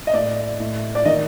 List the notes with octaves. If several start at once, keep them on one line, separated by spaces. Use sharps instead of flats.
D#5
A2 D5
A2
D5
D#3 D#5